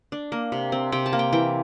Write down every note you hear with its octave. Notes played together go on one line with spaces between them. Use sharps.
D4
A#3
C3
C4
C3 G5
A5
A#3
G5
E3 G5